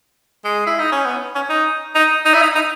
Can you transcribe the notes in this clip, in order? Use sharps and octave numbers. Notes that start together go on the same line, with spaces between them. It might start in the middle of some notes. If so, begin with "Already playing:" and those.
G#3
E4
D#4
C#4
B3
C#4
D#4
D#4
D#4
E4
D#4
D#4